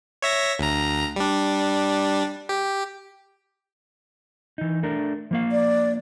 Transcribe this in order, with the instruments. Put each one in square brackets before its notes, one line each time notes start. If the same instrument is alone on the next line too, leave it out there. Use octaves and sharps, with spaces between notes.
[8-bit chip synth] C#5 E5 A#6
D2 A#5
G3 D4
G4
[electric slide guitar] E3 D#4
A3 D4 A#4
F3 A#3 F5
[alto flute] D5